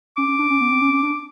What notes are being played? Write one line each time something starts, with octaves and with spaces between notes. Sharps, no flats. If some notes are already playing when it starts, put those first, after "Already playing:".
C#4 D6
C#4
D4
C#4
B3
C4
C#4
C#4
D4